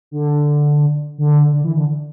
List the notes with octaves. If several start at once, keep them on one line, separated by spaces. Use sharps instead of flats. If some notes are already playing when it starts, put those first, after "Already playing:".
D3
D3
D3
E3
D3